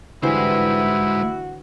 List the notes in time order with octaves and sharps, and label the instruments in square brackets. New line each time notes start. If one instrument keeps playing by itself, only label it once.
[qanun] D3 E3 G3 [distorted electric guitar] G#3 C5 [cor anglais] E4 [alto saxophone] F#4